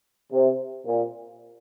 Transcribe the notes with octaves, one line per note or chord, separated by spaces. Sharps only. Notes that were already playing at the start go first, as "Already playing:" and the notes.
C3
A#2